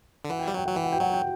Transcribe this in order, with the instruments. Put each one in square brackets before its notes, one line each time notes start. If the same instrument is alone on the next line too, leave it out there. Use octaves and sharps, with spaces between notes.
[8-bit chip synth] D3
[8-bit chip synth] E3 [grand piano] F#5
[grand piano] G5
[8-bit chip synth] G3 [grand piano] F#5
[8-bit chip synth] F#3 [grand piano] G5
[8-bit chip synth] F#3 [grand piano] F#5
[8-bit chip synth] E3 [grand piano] G5
[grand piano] F#5
G5
[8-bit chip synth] F#3 [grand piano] F#5
[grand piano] G5